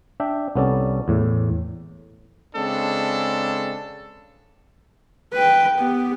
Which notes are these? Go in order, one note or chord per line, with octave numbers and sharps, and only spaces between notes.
D4 E5 G5
C2 B3 C#4 A4 D5 A5
E2 A2
C#3 G#3 C4 D4 A4
B4 G5
B3 G4